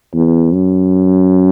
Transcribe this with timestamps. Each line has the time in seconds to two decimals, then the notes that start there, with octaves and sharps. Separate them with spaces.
0.14 E2
0.53 F#2